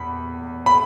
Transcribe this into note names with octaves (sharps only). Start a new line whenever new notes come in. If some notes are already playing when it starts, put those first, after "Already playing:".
Already playing: E2 B5
B5